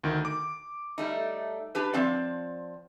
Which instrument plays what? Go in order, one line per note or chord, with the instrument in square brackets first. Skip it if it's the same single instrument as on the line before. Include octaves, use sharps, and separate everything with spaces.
[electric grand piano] D2 D#3
D6
[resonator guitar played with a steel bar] G3 A3 D#4
D4 G4 B4
F3 C4 D5